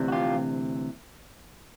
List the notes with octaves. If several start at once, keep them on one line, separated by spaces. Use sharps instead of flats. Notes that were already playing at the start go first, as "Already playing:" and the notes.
Already playing: D2 C3 E3
F#4
F4 G4